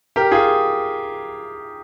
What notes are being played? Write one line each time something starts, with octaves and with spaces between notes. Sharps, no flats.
G4 A#4
F4 G#4